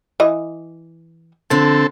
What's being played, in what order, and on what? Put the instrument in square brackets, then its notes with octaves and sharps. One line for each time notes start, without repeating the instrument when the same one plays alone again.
[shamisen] E3 D#5
[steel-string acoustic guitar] F2 D3 [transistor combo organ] C4 A4